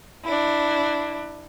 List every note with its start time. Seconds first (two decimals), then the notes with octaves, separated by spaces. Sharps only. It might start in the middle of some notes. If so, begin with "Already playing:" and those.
0.25 D4 E4